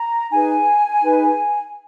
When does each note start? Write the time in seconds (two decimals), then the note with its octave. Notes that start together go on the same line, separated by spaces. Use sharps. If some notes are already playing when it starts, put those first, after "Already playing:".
Already playing: A#5
0.31 D#4 G#4 B4 G#5
1.03 D#4 G#4 B4